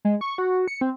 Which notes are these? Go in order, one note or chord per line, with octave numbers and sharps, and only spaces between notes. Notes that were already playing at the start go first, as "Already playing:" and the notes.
G#3
C#6
F#4
C#7
C4